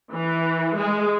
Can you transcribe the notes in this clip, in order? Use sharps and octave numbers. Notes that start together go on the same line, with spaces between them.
E3
G#3